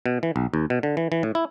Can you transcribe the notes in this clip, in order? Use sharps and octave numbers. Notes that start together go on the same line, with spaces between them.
B2
E3
B1
D#2
B2
D3
E3
E3
A2
E4